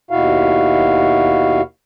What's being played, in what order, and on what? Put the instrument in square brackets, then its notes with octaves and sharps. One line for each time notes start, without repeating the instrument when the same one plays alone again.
[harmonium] D#2 B2 E4 F#4 F5